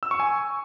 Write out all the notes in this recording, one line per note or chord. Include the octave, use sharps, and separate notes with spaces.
E6
C#6
G#5